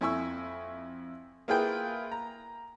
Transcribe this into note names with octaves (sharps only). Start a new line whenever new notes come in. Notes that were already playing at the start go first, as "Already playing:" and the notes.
F2 E4 G#5 C#6 E6
A#3 E4 F4 G#4 B4 G5
A#5